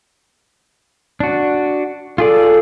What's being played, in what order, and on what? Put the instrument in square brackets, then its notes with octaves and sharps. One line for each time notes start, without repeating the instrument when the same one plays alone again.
[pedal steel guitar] D4 F#4
[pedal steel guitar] F4 G#4 D5 [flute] A4